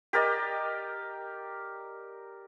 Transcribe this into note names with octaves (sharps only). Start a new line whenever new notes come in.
G4 A#4 D5 D#5